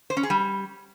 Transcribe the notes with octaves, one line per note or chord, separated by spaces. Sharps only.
C5
C#4
G#4
G3